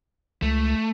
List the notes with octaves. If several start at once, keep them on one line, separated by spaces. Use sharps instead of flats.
C#2 A3